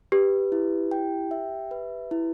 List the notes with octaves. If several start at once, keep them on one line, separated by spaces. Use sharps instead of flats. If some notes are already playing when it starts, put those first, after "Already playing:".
G4 B4
E4
G5
E5
B4
E4